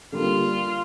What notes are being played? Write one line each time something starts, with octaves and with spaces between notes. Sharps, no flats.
D3 G3 A#3 F4